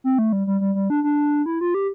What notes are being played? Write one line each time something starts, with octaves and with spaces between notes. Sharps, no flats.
C4
A3
G3
G3
G3
G3
D4
D4
E4
F4
G4